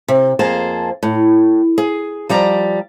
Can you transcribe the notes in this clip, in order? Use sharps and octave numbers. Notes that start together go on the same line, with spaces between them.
C3
F2 A#3 G#4 C5 A5
A2
G#4
F3 G3 D5 A#5